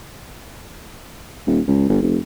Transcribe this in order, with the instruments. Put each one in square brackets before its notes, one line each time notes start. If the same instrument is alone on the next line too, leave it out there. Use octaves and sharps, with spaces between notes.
[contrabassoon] D#1
C#2
G1
F1